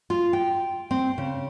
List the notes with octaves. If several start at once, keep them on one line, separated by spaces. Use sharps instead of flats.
F4
G5
C4
C#3